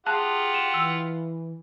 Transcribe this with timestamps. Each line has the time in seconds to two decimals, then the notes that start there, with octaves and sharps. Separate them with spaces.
0.06 F4 G4 G#4 F#5 A5 F#6
0.54 E7
0.74 E3 E6